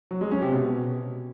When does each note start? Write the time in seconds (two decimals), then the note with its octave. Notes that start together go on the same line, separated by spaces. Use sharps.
0.11 F#3
0.21 G#3
0.31 C#4
0.42 C3
0.52 B2